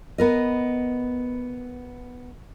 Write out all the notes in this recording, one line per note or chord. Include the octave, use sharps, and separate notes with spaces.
B3 A#4 D#5